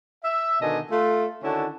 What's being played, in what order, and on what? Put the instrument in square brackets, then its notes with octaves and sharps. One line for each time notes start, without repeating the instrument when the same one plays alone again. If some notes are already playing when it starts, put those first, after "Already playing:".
[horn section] E5
B2 D3 D#3 D#5 G#5 A5
A3 F4 A4
D3 D#3 C#4 E4 F#4 A5